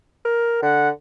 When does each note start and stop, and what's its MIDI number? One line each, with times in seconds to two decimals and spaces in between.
0.25 0.60 70
0.62 0.90 50
0.62 0.89 78